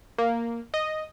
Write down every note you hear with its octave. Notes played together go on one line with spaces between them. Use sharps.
A#3
D#5